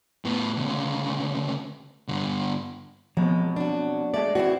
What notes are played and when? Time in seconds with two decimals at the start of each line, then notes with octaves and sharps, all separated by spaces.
0.25 A2 B3
0.57 D2 C#3
2.08 G2 D3
3.17 F2 B2 F3 F#3 G#3
3.56 D4 F#4
4.14 G#3 A3 D5
4.35 E3 C4 E4 F#4